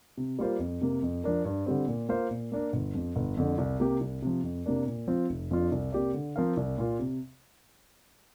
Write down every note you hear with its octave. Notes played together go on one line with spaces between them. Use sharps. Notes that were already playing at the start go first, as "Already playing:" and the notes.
C3
G3 A#3 F4 C5
F2
C3 A#3
F2
F3 D4 A#4
G2
D3 G3 C4
A#2
A#3 F4 C5 F5
A#2
A#3 D4 A#4
G1
F2 F3
G1
F2 D3
C2
C3 A#3 G4
C2
C3 F3
F2
C3 A#3 D4 A#4
A#2
F3 C4 F4
F1
F2 F3 D4 F4
C2
C3 A#3 G4 D5
D3
F3 C4 A#4 F5
C2
A#2 A#3 F4
C3